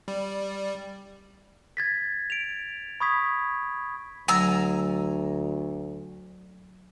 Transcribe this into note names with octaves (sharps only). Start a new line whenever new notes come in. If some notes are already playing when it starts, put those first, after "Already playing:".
G3
G#6 A6 B6
D7 F7
B5 C#6 D#6 G#6 B6
D2 F#3 G#5 A#5 E6